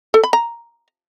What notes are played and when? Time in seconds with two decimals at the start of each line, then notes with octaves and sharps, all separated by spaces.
0.14 A4
0.24 B5
0.33 A#5